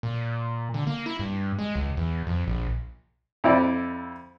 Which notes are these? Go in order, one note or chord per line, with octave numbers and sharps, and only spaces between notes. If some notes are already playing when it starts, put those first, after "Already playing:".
A#2
D3
A#3
E4
G2
G#3
C#2
E2
F2
A#1
F2 E4 D5